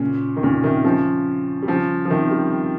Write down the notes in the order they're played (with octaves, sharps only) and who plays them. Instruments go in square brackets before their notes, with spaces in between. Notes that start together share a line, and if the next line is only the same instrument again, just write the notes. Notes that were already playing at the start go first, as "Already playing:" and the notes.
Already playing: [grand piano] A#2 C#3
D#3
A#2 C#3
C3 D#3
C#3 F3
G3
C#3 F3
F3
C3 D#3
G3